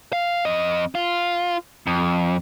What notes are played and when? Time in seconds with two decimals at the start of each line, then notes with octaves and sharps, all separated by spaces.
0.13 F5
0.45 F2 D#5
0.95 F4
1.87 F2